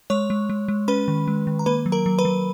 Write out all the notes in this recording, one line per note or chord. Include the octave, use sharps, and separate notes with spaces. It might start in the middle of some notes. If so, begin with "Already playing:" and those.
G#3 C#5 C#6
G#3
G#3
G#3
C#4 B4 B5
D#3
G#3
D#3
A#5
A#3 B4 B5
F#3
A#4 A#5
F#3
B4 B5
F#3